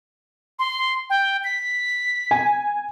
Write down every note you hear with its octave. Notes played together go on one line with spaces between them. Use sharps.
C6
G5
B6
G#5